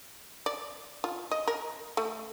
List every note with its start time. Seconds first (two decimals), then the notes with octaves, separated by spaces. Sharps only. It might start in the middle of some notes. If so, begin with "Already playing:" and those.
0.46 D5
1.04 F4
1.31 D#5
1.47 A#4
1.97 A3